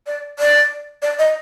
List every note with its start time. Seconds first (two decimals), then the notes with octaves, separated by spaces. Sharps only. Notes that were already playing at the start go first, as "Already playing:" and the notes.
0.07 D5
0.39 D5
1.02 D5
1.19 D#5